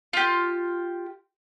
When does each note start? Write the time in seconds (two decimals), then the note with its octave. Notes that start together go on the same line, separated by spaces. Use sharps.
0.13 F4 G4